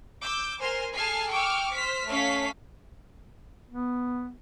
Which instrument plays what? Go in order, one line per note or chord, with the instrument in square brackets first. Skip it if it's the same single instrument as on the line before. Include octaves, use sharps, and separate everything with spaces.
[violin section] D6 E6 G6
A#4 C5 G#5 C6 F6
G#4 A4 G#5 A5 F6 C7
G5 C#6 D6 E6 F6
C5 F6 B6
A3 C#4 F5 B6
[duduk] B3